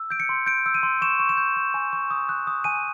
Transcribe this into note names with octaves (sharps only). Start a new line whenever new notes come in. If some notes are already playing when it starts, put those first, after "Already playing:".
Already playing: E6
G6 D7
C#7
C6
G6 D7
E6
D#7
C6
C#6 E7
C#6
E7
G6
C#6
G#5
C#6
D#6
F#6
D#6
G#5 D#7